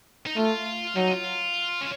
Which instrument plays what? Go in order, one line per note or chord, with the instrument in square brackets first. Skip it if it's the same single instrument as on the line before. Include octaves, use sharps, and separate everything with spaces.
[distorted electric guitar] D#4
[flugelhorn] A3 [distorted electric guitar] F4
[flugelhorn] F#3 [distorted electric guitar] D#4
[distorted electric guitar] F4
C#4